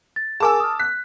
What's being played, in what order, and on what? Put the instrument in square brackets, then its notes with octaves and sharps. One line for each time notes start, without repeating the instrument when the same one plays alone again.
[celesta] A6
[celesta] G#4 A#4 G#5 [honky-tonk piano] A5 D6 E6
[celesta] D#6 F6
[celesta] F#6 [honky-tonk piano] B6